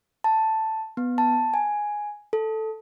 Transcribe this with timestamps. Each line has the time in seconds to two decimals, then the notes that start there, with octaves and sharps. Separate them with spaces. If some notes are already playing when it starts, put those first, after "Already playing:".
0.24 A5
0.97 B3
1.18 A5
1.54 G#5
2.33 A4